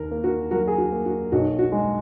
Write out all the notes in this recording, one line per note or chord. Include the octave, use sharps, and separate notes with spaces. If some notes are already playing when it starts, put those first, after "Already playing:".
Already playing: D#2 A#4
A#3
F#4 A#4
F#3 F#4 A#4
G#4
F#4
A#3
F#4
B1 F#4
F#4
G#3